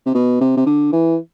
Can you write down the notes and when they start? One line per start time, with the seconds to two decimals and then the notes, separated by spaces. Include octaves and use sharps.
0.06 C3
0.15 B2
0.41 C3
0.57 C3
0.66 D3
0.92 E3